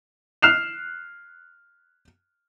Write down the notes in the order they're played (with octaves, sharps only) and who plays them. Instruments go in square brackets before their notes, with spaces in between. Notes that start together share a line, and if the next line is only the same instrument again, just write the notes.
[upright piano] F6 F#6 C7 E7 F7